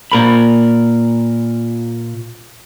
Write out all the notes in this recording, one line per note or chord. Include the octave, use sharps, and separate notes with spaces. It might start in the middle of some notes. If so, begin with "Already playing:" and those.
A#2 A#4 B5